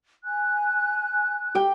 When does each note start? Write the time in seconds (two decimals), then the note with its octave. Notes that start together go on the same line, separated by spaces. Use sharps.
0.24 G#5 F#6
1.55 G4 G5